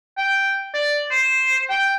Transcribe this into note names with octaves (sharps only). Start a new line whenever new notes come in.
G5
D5
C5
G5